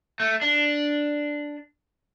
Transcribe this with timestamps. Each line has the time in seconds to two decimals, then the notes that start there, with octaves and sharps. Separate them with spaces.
0.20 A3
0.42 D4